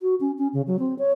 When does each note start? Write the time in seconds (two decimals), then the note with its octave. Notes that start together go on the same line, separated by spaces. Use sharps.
0.02 F#4
0.20 C#4
0.38 C#4
0.53 C#3
0.67 F#3
0.79 C4
0.99 C#5